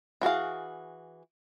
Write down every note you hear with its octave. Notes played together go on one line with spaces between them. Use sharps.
E3 F#4 G#4 F5